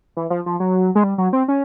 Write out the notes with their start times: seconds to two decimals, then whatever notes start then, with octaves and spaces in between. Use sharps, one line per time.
0.17 E3
0.30 F3
0.46 F3
0.60 F#3
0.95 G#3
1.04 G3
1.18 F#3
1.33 C4
1.48 C#4